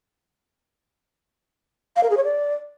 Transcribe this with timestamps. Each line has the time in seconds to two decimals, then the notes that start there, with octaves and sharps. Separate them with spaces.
1.96 F5
2.03 A#4
2.10 G#4
2.17 C#5
2.24 D5